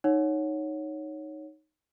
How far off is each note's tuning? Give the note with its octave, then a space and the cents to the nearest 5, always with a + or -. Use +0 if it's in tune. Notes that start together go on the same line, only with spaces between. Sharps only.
D#4 +0 C#5 -5 F#5 -10